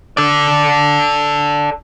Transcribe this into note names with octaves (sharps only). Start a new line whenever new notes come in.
A4 D5